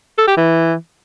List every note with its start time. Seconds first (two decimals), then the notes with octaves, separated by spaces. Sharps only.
0.18 A4
0.27 G4
0.37 E3